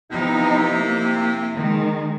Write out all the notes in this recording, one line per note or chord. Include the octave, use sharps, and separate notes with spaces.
C3 F3 B3 D#4 E4
A#3
D#3 G#3